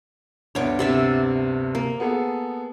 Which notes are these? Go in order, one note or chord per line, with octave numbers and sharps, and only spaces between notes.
D2 G2 B3 C#5 D6
C3 D5 E5
A#3
B3 G#4 A4